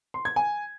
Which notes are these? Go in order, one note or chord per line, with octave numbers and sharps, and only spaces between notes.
C6
G#6
G#5